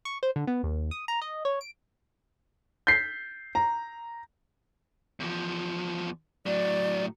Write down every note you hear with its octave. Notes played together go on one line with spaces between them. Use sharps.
C#6
C5
D3
B3
D#2
D#6
A#5
D#5
C#5
D7
G6 B6 C7
A#5
E2 F3
A2 F#3 D5